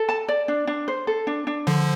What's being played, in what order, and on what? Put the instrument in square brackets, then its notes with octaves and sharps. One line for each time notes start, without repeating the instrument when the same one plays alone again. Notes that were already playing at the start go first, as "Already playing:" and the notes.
Already playing: [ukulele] A4
A5
D5
D4
D4
C5
A4
D4
D4
[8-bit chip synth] D3 F3 [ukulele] C5